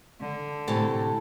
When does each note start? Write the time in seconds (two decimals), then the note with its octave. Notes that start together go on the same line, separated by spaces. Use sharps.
0.20 D3
0.68 A2 C3 A4 C#5 G#5 A5